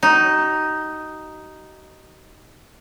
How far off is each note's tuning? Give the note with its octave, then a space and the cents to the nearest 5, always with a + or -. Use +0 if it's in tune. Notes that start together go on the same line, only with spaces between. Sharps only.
D#4 +0 F#4 +45